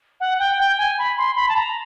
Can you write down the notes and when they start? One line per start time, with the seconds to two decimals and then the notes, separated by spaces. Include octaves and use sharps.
0.20 F#5
0.39 G5
0.59 G5
0.78 G#5
0.98 B5
1.18 C6
1.36 B5
1.49 A5
1.57 A#5